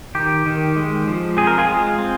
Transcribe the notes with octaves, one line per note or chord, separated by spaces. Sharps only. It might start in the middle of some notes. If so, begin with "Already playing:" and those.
D#3 G4
D#3
G#3
F3
C4 G#4
A#4
F4 G#4
G#3
C4